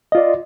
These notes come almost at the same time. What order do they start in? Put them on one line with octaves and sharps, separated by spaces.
D#5 F4 D5